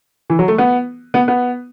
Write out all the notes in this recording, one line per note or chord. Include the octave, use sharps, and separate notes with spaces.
E3
F#3
A3
B3
B3
B3